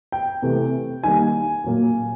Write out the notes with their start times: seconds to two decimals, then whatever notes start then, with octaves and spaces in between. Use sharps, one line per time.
0.12 G5
0.42 C3 E3 A3
1.04 D#3 G3 A#3 G#5
1.64 A#2 F#3 A#3